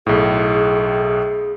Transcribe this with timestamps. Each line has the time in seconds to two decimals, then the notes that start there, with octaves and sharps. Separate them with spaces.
0.06 B1 A2 G#4